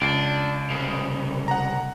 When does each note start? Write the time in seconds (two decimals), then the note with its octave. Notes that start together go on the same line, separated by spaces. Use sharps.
0.01 C#2 D4 C7
0.70 C2 C#3
1.48 F#5 A#5